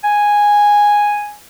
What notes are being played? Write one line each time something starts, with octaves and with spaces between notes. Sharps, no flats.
G#5